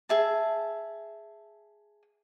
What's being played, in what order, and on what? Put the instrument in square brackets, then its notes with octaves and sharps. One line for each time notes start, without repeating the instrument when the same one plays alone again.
[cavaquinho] G#4 E5 A5